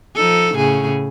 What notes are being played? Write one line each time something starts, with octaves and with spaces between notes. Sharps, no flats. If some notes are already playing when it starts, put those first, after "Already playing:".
F3 D#4 A4
A2 C#3 G#4